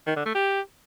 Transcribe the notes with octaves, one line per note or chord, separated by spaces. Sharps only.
D#3
D3
A3
G4